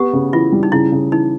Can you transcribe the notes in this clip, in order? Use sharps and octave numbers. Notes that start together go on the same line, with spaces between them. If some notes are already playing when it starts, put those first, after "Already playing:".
Already playing: B3 G4
C#3
E3 F4
G3
D#4
C#3 E4
C#3
E3 D#4